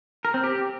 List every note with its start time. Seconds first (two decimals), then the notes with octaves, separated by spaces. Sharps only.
0.25 A#4
0.34 C4
0.44 G4